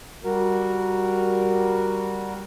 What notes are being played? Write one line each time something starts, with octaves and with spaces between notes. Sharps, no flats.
G3 F#4 A#4